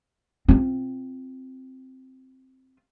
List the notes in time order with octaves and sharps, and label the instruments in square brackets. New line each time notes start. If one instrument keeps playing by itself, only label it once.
[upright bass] C4 F4